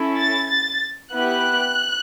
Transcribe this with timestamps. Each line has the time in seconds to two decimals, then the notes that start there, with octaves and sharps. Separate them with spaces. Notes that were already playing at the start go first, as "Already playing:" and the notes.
Already playing: C#4 E4 A4
0.19 A6
0.50 A6
1.12 B3 E4 G4 F#6